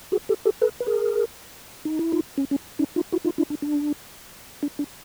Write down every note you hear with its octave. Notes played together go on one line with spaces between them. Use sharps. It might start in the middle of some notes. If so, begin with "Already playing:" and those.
F#4 G#4
G4 A4
G4 A4
A4 B4
B4
G#4 A#4
D#4
E4
D#4 F4
C#4
C#4
C#4 D#4
D#4 F4
E4 F#4
D#4 F4
D4 E4
D4
D4
D4
D4